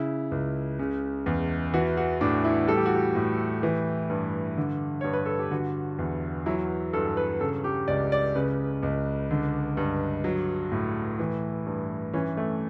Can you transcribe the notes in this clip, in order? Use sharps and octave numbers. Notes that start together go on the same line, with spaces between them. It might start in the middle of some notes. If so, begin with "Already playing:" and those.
Already playing: C#3 E4
C#2
C#3
E2
E3 F#4
F#4
A2 D4
E4
G3 A4
G4
F#4
G4
A2
E3
G2
D3
G2 C#5
B4
A4
G4
D3 F#4
E2
F#3 E4
G2 A4
B4
C#3 A4
G4
C#2 D5
D5
C#3 B4
C#2
D3
G2
F#3
A2
E3
G2
E3 C#4
A3